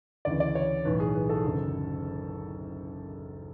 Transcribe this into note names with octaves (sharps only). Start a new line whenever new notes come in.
D2 C#3 E3 D5
D5
C#5
B1 A2 E3 B4
G#4
B4
A4
F#1 F#2 D3